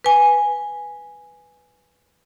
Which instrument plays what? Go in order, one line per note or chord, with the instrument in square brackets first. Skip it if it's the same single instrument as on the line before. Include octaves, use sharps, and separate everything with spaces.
[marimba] B4 G#5